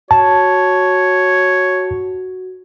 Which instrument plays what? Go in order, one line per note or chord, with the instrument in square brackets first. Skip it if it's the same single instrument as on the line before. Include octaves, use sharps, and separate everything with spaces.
[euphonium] F#4 [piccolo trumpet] C#5 [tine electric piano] A5